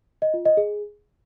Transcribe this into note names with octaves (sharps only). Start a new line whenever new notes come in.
D#5
F4
D#5
G#4